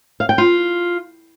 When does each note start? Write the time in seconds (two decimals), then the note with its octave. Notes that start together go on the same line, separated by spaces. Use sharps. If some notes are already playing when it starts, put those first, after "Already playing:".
0.20 F5
0.29 G5
0.38 F4